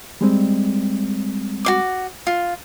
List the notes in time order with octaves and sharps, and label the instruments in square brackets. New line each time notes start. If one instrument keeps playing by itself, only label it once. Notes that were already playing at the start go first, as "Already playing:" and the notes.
[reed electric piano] G3 G#3 C4
[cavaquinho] F#4 C5 D6
F4